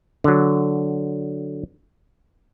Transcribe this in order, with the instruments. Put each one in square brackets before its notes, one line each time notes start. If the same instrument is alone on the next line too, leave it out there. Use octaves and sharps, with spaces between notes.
[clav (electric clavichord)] D3 F#3